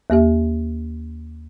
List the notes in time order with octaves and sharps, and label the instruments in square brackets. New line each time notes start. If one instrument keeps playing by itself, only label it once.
[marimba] D#2 A#3 G4 E5